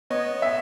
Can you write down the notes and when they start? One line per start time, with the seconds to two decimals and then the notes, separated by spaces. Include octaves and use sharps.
0.10 B3 C#5 D#5
0.42 E5